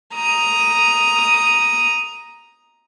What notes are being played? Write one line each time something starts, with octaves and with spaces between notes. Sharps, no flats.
A#5 D#6